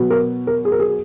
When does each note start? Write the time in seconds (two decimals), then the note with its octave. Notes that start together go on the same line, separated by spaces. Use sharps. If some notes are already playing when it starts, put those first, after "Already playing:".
Already playing: B2 F#3 B3
0.10 A#4
0.47 A#4
0.65 G#4
0.72 A#4
0.80 G#4